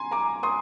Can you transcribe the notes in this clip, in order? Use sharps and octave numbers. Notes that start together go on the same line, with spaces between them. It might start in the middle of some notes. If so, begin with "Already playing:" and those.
Already playing: G#5 A#5 C6
A#5 D6
C6 D#6